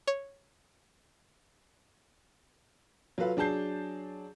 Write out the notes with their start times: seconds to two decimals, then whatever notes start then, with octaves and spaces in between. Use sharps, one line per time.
0.07 C#5
3.18 F#3 F4 A4 B4 F5
3.37 F#3 D4 G#4 A5 G6 C7